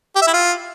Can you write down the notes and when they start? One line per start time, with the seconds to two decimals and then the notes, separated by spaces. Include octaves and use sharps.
0.16 G4
0.22 E5
0.28 E4
0.33 F4